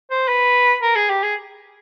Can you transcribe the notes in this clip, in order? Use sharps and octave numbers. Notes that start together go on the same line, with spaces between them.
C5
B4
A#4
G#4
G4
G#4